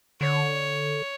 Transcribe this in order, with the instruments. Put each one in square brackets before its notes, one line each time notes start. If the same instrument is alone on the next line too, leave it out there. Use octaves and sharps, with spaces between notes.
[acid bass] D3 [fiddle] C#5